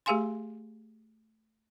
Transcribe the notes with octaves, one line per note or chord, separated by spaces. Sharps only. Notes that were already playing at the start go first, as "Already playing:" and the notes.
A3 G4 G#4 F5 G#5 C6